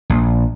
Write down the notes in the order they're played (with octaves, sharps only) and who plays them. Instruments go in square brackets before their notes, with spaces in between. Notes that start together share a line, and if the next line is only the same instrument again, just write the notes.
[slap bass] A#1